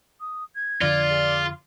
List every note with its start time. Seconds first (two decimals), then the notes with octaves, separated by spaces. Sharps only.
0.20 D#6
0.55 G#6
0.81 F2 D3 F4 D5
1.10 G#4